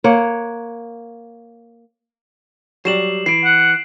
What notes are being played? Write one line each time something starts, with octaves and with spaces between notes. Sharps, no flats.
A#3 C#5 F#5
F#3 G3 C7 E7 F#7
E3 C7 D7
F#5